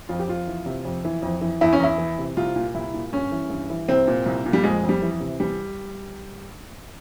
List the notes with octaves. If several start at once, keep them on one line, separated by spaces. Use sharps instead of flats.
F2 F4
G4
F2 F4
E3
C3
F2
E3
F2
E3
E2 E4
C#4
E2 E4
E3
C3
C2 F4
A#2
C2 E4
A#2
G2 C#4
E3
G2
E3
C2 C4
A#2
C2
A#2
G3
F2 G#3
F2
G3
E3
C3
E2 G3